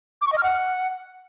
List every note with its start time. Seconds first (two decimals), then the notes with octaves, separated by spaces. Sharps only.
0.21 D6
0.27 C#6
0.32 D#5
0.38 F6
0.43 F#5